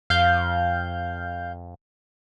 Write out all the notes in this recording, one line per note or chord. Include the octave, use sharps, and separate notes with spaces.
F2 F5 G6